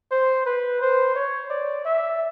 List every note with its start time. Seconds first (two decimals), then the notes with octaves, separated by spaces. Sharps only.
0.11 C5
0.46 B4
0.81 C5
1.15 C#5
1.50 D5
1.85 E5